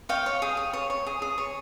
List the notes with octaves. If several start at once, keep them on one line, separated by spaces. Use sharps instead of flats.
C#5 F5 G5
C#5
G#4
G#4
C#5
C#5
G#4
G#4
C#5